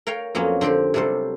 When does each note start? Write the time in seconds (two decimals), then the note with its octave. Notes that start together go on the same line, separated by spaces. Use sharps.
0.07 A#4 C#5 F5 G5
0.35 F2 F#3 A#3 B3 C#4
0.61 D3 C4 G4 G5 C6
0.94 C3 F#3 G3 A4 C5